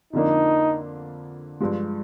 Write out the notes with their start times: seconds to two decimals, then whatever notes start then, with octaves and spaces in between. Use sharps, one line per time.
0.13 F2 D3 F3 A#3 D4 D#4
1.60 G2 F3 G#3